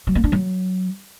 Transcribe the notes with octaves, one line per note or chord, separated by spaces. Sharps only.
F#3
A#3
D4
F#3